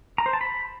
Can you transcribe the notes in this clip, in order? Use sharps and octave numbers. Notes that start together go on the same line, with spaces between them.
A#5
C5
A5
B5